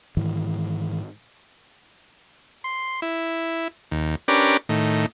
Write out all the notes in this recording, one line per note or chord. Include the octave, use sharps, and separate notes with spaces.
G#2 D#3 E3
C6
E4
D#2
C#4 D4 G4 A#4 B4 D5
A2 D#3